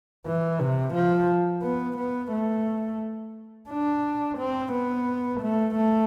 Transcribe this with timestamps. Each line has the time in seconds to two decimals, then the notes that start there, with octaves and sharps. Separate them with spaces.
0.27 E3
0.61 C3
0.95 F3
1.63 B3
1.98 B3
2.33 A3
3.70 D4
4.39 C4
4.73 B3
5.41 A3
5.76 A3